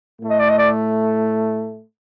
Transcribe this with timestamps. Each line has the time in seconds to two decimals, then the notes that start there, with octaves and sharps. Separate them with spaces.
0.21 A2 A3
0.30 D#5
0.39 D5
0.49 D#5
0.58 D5